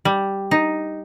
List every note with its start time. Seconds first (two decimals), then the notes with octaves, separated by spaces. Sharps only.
0.05 G3
0.51 D#4